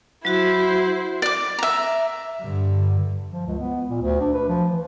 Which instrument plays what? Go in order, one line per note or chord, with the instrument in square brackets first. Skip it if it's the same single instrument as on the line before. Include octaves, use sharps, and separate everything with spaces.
[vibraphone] F#3 F#4 [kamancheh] E4 C5
[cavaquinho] D5 D6
E5 A#5
[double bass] G2 D3
[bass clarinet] F3
C#2
B3
A#2
D2
D4
B4
F3
E3